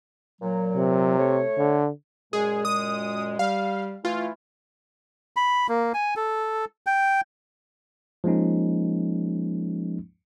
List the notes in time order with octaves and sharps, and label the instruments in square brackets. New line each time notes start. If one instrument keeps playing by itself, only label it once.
[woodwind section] A#2 F#3
[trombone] C3
[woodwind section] A3 C#5
[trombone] D3
[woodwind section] F#2 A#2 G#3 [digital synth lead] G#4
[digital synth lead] D#6
[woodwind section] G3 [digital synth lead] F5
[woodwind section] E3 A3 E4 [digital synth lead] F4
[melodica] B5
A#3
G#5
A4
G5
[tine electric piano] F3 G#3 A#3 C#4 D#4